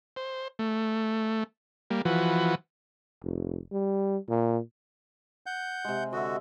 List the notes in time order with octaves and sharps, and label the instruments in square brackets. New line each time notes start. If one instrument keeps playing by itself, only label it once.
[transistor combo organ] C5
A3
G3 A#3
E3 F3 F#4 B4
[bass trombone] F1
G3
A#2
[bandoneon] F#5 G6
[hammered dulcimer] C3 G#3
[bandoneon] D3 F#4 [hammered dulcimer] D#5 E5